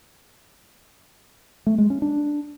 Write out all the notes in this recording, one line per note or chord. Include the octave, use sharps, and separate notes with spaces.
A3
G#3
C#4
D4